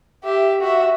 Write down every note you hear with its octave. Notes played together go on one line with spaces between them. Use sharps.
G4 E5
F#4 E5